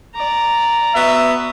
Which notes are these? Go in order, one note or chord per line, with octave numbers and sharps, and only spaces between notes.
D5 A#5
B3 F#4 E5